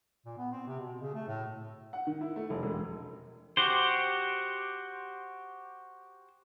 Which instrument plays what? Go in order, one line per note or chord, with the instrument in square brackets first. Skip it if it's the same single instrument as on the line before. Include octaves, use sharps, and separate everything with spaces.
[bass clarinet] A#2
B3
C4
C3
B2
C#3
A3
A2
[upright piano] F#5
D#3
E4
A3
F1
E1
[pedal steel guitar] F#4 G4 C5